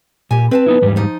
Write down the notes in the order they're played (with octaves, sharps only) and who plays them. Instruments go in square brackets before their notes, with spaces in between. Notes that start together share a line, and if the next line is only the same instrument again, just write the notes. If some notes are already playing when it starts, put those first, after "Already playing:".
[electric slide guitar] A#2 [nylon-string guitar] G4 G#5
[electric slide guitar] C4 [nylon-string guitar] B4 G5 A5
[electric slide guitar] B3 D#4 E4
E2 G#2 G3
[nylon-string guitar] F3 D#4